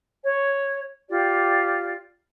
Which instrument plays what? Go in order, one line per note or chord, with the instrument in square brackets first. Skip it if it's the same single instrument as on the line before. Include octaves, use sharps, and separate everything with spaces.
[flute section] C#5
F4 G4 D5